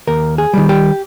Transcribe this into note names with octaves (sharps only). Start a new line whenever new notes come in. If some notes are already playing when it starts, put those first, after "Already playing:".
D#2 A#4
G#4
D#3 G3
G4